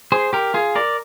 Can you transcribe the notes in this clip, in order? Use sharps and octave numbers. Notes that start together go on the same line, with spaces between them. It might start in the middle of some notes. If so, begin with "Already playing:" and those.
G#4 C5
G4 A#4
F4 G#4
A#4 D5